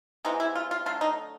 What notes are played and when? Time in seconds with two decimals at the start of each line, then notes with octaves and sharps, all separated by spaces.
0.25 C3 E3 G#3 B3 D#4
0.40 E4
0.55 F4
0.71 F4
0.86 D3 F#3 A3 F4
1.01 D#4